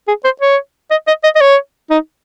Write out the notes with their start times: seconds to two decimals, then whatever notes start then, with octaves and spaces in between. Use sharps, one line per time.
0.08 G#4
0.25 C5
0.42 C#5
0.91 D#5
1.08 D#5
1.24 D#5
1.36 D#5
1.41 C#5
1.90 D#4